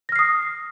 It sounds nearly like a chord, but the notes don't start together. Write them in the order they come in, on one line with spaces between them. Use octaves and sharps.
A#6 F6 C7 D#6